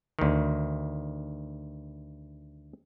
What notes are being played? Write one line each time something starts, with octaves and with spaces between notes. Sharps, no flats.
D2 D#3